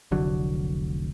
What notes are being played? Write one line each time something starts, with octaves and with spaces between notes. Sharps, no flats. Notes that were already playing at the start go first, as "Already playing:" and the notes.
F1 C2 D3 F#3